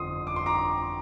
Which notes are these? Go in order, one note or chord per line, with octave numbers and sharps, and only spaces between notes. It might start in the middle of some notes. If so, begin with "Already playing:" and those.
Already playing: G1 F2 D3 F3 C6 D#6
D6
C6
A#5 D6